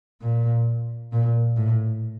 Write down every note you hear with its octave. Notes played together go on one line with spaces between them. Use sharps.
A#2
A#2
A2